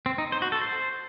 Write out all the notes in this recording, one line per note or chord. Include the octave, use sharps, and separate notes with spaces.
C4
D#4
C5
F#4
A4
C5